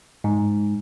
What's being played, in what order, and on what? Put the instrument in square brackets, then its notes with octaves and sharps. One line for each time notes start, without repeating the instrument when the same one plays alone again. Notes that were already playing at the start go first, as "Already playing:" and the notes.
[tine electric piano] G#2